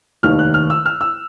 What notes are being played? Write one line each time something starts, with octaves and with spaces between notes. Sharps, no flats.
F1 D#2 D#3 F6
F#6
F6
E6
F6
E6